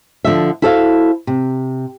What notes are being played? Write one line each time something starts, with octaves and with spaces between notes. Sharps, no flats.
D3 F3 E5
E4 F#4 A4 C5 D5 F5
C3